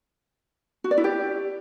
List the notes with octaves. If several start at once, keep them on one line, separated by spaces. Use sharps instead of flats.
F#4
D5
E4
G4